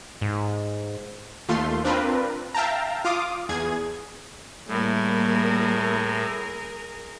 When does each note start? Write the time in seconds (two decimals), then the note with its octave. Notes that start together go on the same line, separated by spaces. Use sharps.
0.21 G#2
1.49 D#2 A3 F4 C6
1.85 C4 D4 F4 A#4 B4
2.54 E5 F5 G5 A5 A#5
3.05 F4 F5 D6 D#6
3.49 E2 G#4 G#6
4.68 A2 G3 A#3 E4 G#4 A#4